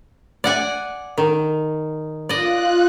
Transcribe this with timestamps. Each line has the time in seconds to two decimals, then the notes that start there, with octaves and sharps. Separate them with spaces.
0.44 D5 F#5 G#5
1.18 D#3
2.29 F4 D5 D#5 F#6